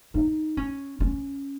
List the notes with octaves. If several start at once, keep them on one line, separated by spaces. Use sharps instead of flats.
D#4
C#4
C#4